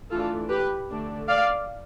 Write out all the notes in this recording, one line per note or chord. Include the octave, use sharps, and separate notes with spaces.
E3 A3 D4 F4 A4
G4 B4
D3 A3 D4
D5 F5